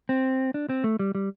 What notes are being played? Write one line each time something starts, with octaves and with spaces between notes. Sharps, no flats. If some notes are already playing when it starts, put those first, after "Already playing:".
C4
D4
C4
A3
G3
G3